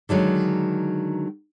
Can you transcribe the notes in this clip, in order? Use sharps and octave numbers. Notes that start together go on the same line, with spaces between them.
D3 D#3 F#3 G#3